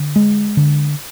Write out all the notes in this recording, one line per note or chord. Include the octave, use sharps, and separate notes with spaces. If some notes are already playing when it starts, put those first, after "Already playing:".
Already playing: D3
G#3
D3